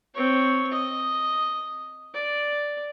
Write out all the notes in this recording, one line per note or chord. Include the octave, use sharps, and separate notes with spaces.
C4 C#5
D#5
D5